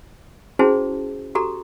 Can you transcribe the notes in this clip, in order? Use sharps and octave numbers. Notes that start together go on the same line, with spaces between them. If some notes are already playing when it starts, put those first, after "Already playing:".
C#4 E4 F#4 G#4 C5 A5
F#4 G4 A4 A#5